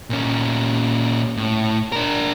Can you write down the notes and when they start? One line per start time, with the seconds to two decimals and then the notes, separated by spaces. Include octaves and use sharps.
0.10 A#2 C#4
1.37 A2
1.92 D4 A#4